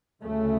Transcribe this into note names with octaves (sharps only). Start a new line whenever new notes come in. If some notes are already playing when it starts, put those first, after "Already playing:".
D2 C#3 A3